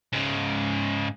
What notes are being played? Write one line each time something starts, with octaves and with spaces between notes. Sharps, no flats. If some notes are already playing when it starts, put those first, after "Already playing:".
G#2 C#3